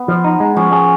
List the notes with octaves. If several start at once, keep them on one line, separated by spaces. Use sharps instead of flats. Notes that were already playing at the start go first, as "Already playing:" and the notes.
Already playing: B3
F3
D#4
G#3
F3 C#4
G#4